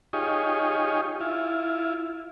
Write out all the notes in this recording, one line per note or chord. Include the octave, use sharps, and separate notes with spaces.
D#4 F4 G4 G#4 C#5 D#5
E4 F4